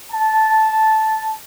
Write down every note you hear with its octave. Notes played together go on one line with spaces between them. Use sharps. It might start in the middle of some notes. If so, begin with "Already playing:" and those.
A5